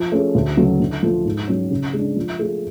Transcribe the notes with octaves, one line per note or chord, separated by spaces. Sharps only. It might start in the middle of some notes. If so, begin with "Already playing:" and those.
Already playing: F3
A3 C#4 G#4
D2
C#3 F#3 A3
D3
F3 A3
G#2
F#3 C#4
C#3
G#3 D4
F3
A3 F4 G#4